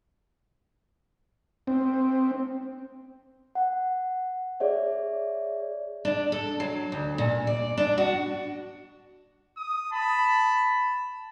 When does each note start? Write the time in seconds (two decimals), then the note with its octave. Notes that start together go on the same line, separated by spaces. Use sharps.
1.67 C4
3.55 F#5
4.60 G#4 C#5 D5 E5
6.05 D4
6.32 A4
6.60 F#3
6.92 D2
7.18 A#2
7.47 D5
7.78 D4
7.98 F#4
9.57 D#6
9.92 A5 B5